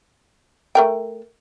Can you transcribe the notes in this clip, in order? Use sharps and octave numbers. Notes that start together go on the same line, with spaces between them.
A3 A#4 G5